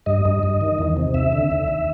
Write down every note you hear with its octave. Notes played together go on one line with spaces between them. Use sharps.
G2 D#5
G2
G2
D#3
E2
C3
D#2 E5
D3
D#2
D#2